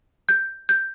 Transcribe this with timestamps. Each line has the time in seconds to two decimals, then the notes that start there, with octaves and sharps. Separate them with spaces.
0.29 G6
0.69 G6